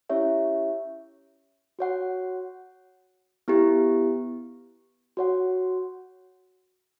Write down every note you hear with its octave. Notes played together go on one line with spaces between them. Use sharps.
C#4 E4 G4 C#5 E5
F#4 C#5 F#5
B3 E4 G4
F#4 C#5 F#5